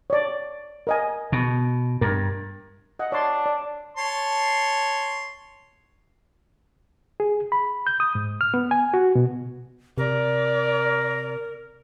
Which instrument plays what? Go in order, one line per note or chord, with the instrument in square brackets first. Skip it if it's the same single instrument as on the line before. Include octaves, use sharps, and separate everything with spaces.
[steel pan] C#5 D5
A#4 D#5 G#5
[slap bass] B2
[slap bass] G2 [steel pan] A#4
[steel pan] D#5 F#5
[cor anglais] D4 [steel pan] C#5 A5 C6
[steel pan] D5
[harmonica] C#5 A5 C6
[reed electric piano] G#4
B5
G6
D#6
G#2
F6
B3
G#5
F#4
B2
[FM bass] C3 [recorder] A#4 [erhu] D5